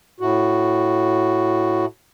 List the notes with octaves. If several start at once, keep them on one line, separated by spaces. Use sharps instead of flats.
A2 F#4